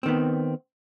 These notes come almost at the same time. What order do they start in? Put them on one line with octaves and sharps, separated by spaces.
C4 D#3 B3